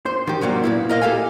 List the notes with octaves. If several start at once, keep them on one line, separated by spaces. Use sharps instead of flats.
C5
D#3 G4
C3 F#3 G3 A#3
A#2 B3 E4
A#4 D#5 F5
G4 A4 F5 G#5